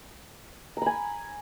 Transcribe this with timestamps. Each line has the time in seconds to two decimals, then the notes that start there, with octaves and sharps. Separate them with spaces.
0.77 A#5
0.82 B5
0.86 G#5